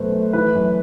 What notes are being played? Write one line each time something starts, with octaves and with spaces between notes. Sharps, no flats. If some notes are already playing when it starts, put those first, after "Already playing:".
Already playing: F#2 B2 A3 B4 C5
A3
E3 B4
F#2